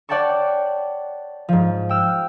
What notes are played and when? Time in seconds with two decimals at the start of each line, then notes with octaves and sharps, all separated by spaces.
0.09 C#5 D5 F#5 G5 A5 C#6
1.49 G#2 F3
1.89 G5 E6 F6